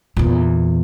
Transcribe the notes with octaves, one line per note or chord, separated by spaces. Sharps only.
E2 A#2